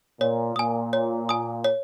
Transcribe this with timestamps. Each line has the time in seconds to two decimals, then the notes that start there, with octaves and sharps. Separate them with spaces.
0.20 A#2 C#5
0.56 A#2 G#5 D#6
0.93 C#5
1.29 G#5 D#6
1.64 C#5